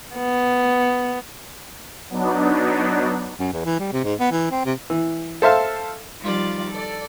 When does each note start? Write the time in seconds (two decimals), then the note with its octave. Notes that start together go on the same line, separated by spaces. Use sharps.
0.15 B3
2.10 F#3 B3 D4 D#4
3.40 F#2
3.53 E2
3.65 E3
3.80 G3
3.92 C3
4.04 G#2
4.20 B3
4.31 E3
4.51 C4
4.65 C3
4.90 E3
5.42 A4 C5 E5 F5 A5
6.22 D#3 F3 G3 F4 D5 A6
6.71 A4 D5